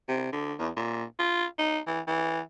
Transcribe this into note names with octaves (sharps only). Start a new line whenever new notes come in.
C3
D3
E2
A#2
F4
D#4
E3
E3